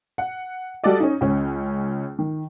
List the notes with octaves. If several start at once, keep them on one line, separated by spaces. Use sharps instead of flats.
F#5
G3 F#4 A4 D5 D#5
C#4 D#4
C#2 C#4
D#3